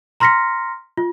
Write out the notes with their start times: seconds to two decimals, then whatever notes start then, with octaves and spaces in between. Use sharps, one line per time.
0.20 A#5 C6 F6 A#6 B6 C#7
0.97 F4